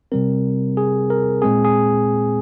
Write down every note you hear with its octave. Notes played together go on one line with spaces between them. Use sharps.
C3 G3 C4 A#4
G#4
A#4
A#2 G#3 C4 G#4
G#4